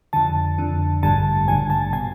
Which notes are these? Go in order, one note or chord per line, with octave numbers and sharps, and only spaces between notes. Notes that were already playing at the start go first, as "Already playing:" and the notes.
F2 D3 A5
F2 D3
A1 G2 D3 A5
A1 G2 D3 G#5
A5
B2 G#5